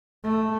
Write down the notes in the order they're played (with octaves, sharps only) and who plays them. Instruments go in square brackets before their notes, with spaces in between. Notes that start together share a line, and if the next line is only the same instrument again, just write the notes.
[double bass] A3